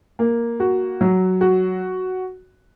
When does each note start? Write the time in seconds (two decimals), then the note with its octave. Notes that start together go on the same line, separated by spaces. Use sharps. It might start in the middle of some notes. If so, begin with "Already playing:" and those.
0.19 A#3
0.60 F#4
1.01 F#3
1.41 F#4